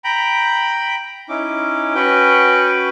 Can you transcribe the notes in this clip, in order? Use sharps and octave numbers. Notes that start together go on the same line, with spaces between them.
G5 A#5 B5
C#4 D#4 E4 D6
C#4 F#4 B4 G5